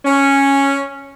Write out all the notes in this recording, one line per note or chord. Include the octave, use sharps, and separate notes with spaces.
C#4